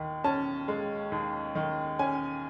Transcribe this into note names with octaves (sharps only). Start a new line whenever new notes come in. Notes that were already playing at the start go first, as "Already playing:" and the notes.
Already playing: D#2 D#3
C#4 A5
G#3
D#2
D#3
C#4 G#5